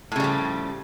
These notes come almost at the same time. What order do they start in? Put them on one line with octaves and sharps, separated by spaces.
A2 C#3 G3 F3